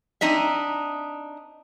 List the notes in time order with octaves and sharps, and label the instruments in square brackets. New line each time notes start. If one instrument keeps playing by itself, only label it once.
[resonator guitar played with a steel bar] C4 D4 D#4 D#5 E5